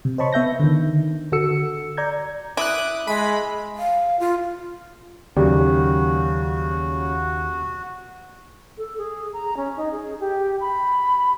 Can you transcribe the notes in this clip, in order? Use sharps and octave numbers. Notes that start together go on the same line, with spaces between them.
C3
C5 C#5 D#5 A5 B5 C#6
B3 E5 G6 A#6
D3 D#3
D3 F#4 A4 E6 C#7
D5 A#5 G6 G#6
E4 D6 D#6 F#6
G#3 B5
F5
F4
D#2 C#3 F#3 F#4 G4 D5
A4
G#4
A#5
C#4
D#4
G#4
G4
B5